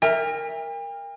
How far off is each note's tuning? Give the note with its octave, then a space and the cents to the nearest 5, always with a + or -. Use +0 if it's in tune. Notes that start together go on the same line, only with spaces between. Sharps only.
A#4 +0 E5 +0 G5 +45